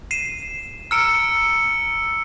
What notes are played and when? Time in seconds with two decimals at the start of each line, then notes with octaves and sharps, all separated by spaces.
0.11 C7 D#7 E7
0.91 A#5 E6 F6 C#7 D7